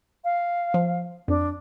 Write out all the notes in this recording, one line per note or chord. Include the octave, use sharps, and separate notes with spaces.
F5
F3
F2 D4